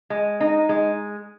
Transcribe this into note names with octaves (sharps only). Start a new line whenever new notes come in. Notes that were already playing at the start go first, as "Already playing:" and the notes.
G#3
D#4
G#3